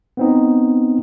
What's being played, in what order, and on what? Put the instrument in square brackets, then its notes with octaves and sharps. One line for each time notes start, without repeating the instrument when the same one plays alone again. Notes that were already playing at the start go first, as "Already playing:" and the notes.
[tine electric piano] B3 C4 D#4